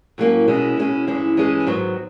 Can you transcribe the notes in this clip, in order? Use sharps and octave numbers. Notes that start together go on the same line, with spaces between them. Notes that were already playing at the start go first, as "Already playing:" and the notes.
A2 F#3 A#3 C#4
B2 G#3 C#4 E4
B2 G#3 C#4 E4
G2 E3 G#3 C#4 E4
G2 E3 G#3 C#4 E4
G#2 D#3 F#3 B3